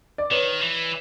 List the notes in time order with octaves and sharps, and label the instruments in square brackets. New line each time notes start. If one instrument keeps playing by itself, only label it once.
[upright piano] D5
[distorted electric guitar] D#3 [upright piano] B4 C#5
[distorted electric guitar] E3